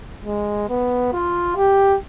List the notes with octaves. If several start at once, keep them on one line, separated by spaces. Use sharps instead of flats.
G#3
B3
F4
G4